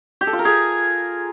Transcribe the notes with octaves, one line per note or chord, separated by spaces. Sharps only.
G4
A4
F4
A#4
G#4